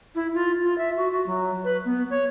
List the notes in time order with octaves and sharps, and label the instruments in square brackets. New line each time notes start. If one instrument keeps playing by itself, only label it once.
[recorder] E4
F4
F4
E5
F#4
F#4
F#3
B4
B3
C#5